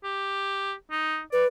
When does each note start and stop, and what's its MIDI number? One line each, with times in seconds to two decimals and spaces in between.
0.04 0.74 67
0.90 1.21 63
1.33 1.47 71
1.33 1.44 74